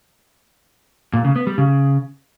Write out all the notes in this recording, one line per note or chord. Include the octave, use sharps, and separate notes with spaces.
A#2
C#3
B3
G3
C#3